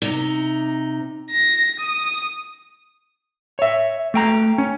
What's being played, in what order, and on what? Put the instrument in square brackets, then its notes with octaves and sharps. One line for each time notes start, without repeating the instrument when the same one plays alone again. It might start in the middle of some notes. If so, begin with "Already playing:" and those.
[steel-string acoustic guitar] C3 D#4
[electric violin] A#6
D#6
[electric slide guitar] C#5 E5
A3 G5 A#5
C#4